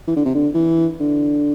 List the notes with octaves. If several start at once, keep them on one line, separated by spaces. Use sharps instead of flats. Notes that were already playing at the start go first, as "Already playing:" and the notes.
E3
D3
C3
D3
E3
D3